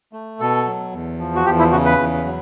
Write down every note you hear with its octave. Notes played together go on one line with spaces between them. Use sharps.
A3
B2 A4
F#3
E2
F3
F#4
E2 G4
E4
C#3 F#4
B4
E2
F#3